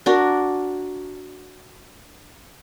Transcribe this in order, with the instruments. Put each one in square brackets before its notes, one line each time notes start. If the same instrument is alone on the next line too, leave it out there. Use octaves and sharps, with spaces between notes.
[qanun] D4 F#4 A#4